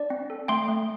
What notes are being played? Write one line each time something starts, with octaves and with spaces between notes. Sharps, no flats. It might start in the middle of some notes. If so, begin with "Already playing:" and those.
Already playing: D4 D5
C4
A4
A3 G5 C6
A3